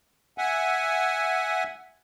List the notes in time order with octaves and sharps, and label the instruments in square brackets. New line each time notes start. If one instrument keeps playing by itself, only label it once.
[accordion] E5 F#5 G#5